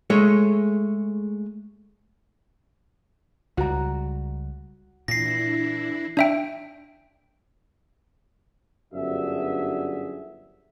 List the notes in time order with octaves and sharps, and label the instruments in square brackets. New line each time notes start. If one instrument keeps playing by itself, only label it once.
[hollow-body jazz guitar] G#3 A3 G#4 C#5
[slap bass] C#2 G3 [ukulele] F#4 A#5
[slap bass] A#2 [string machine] E3 D4 E4 [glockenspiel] A#6 C7
[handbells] D4 E5 G5
[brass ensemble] G1 F#2 D4 F#4 G#4 E5